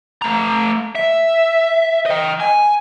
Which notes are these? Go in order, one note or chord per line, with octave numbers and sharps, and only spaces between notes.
A3 A#5
E5
D#5 G5
G#5